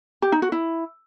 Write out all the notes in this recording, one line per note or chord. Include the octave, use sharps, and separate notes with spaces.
G4
D#4
F#4
E4